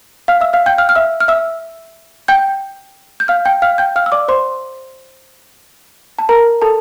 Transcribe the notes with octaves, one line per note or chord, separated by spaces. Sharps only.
F5 F6
E5 E6
F5 F6
G5 G6
F5 F6
F6
E5 E6
F6
E5 E6
G5 G6
G6
F5 F6
G5 G6
F5 F6
G5 G6
F5 F6
E6
D5 D6
C5 C6
A5
A#4 A#5
A4 A5